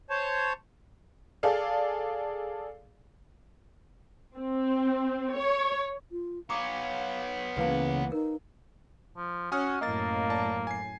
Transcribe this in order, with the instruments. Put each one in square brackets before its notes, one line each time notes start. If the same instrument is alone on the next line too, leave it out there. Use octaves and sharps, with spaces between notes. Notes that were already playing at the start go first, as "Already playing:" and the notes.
[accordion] C5 C#5 A5
[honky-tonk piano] G#4 A4 D5 F5
[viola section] C4
C#5
[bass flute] F4
[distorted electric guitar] B3 C#5 [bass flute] F5 [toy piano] A#5 D6 D#6
[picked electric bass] C#2 E3 A#3 [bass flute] C#3 [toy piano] B4 F5 A5
[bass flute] D#4 [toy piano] A#4
[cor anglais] F3
[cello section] C#4 [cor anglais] F#4 [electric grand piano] G#5 D#6 F6
[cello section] F#2 A2 [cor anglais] A#3 [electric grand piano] D#5 F5 A6
[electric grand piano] D5 A5
G#5 C7